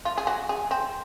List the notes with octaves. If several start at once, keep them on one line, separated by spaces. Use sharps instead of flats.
F4
G#4
F#4
G#4
C4